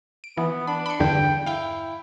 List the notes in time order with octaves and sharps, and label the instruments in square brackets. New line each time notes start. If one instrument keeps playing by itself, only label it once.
[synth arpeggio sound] D7
[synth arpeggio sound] E3 [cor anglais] B3
[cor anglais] D4 [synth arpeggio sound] B5
[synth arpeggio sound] B5 C#7
[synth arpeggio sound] E2 G2 D3 [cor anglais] G5
[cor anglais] E4 [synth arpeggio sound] F5 G5